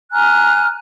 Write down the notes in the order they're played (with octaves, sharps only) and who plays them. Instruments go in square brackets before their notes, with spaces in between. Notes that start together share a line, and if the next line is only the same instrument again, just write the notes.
[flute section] G#5 A#5 F6 F#6